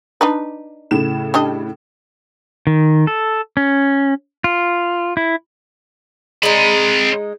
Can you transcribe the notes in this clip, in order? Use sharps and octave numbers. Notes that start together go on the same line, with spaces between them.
D4 D#4 B4
A2 C#3 E7
G3 D4 D#5
D#3
A4
C#4
F4
E4
G#3 C4 D#4 B5